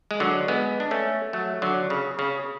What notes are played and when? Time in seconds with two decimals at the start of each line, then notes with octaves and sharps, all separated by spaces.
0.11 G#3
0.20 D3 F#3
0.48 G#3 B3
0.80 D4
0.91 A3 C#4
1.33 F#3 A3
1.62 D3 F#3
1.90 C#3
2.19 C#3